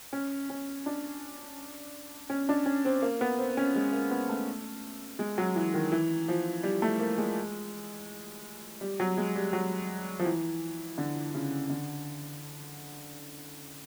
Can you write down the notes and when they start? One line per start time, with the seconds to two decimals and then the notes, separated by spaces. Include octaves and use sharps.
0.13 C#4
0.50 C#4
0.86 D4
2.30 C#4
2.49 D4
2.66 C#4
2.85 C4
3.02 A#3
3.21 B3
3.38 C4
3.57 C#4
3.75 G#3
3.93 A#3
4.11 B3
4.29 A3
5.19 G#3
5.38 F#3
5.56 E3
5.74 D#3
5.92 E3
6.28 F3
6.63 G3
6.82 A3
7.00 A#3
7.18 G#3
8.81 G3
9.00 F#3
9.17 G#3
9.36 G3
9.53 F#3
10.19 F3
10.26 E3
10.98 D3
11.35 C#3
11.70 D3